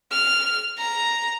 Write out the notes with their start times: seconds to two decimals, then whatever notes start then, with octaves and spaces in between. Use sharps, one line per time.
0.12 F6
0.78 A#5